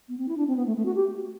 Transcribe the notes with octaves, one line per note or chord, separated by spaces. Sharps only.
B3
C4
E4
D4
C4
B3
A3
A3
F#4
G4